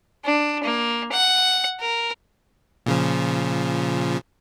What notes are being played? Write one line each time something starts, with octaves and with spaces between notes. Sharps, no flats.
D4
A#3
F#5
A#4
A#2 C#3 F3